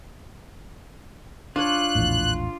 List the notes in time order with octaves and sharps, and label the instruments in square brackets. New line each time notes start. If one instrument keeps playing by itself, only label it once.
[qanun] D4 C#5 [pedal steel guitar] F4 [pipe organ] F#6
[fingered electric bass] A#1 E2 A2